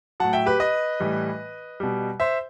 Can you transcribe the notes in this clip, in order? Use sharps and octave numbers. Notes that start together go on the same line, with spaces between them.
A2 F#3 F#5 A5
E5 G5
G4 B4
B4 D#5
A2 E3 G3
B2 G3
C5 E5